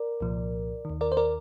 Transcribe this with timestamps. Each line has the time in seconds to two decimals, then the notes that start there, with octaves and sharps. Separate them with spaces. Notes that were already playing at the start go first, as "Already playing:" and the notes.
Already playing: A#4 D5
0.21 C2 A#2 F3
0.85 D#2 D#3
1.01 A#4 D5
1.12 C5
1.17 A#4 D5